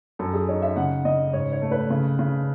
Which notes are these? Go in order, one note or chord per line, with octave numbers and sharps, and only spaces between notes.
F#2 A4
G#4
D#4 C#5
E5
C#3 F#5
C#3 D#5
G#2 C#5
C#5
A3
B4
C#3
C#3